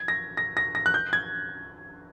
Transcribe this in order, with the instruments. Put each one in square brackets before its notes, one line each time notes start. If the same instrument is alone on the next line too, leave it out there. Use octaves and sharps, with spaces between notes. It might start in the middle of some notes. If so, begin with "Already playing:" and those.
Already playing: [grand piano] G#6
A#6
A#6
A#6
A#6
F#6
G6
G#6